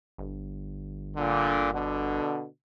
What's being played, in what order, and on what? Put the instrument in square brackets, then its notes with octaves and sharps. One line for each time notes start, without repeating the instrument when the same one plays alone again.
[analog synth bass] G1
[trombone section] A#2 D3
B2 D3